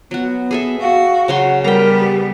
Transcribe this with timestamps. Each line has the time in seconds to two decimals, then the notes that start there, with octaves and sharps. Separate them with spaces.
0.11 F#3 B3 F#4
0.51 G#4 A4 E5
0.81 F#4 F5
1.28 C#3 F#3 F#5 C6
1.64 G3 B3 A#4 G5 A#5
1.99 G4